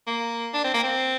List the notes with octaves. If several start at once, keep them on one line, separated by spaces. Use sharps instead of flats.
A#3
D4
C4
A#3
C4